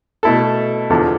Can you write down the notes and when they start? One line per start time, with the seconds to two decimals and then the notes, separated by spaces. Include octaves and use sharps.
0.23 B2 A3 E4 A4
0.90 E2 D3 F3